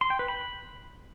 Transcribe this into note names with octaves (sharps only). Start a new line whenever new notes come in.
C6
G5
B4
B5